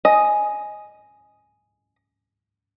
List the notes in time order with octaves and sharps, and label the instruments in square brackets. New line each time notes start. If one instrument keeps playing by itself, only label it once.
[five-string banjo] D#5 [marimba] G#5